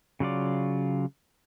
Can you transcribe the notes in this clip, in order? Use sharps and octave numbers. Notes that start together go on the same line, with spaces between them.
C#3 F#3 F4 D5